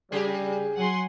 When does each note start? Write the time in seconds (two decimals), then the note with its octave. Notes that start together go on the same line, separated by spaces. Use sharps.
0.12 C#3 G3 G4 G#4
0.76 F#3 F#5 G#5 C6